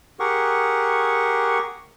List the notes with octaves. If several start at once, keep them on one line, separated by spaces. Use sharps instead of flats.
G4 G#4 A#4 F#5 C#6